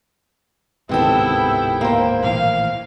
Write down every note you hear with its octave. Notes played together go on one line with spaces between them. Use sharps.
D1 G#2 C3 D#3 B3 E4 A4 G5
A#3 C5
A#1 A2 E3 F5